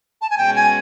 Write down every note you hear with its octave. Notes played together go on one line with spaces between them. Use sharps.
A5
G#5
B2 G#3 C#4 F#4 G5
G#5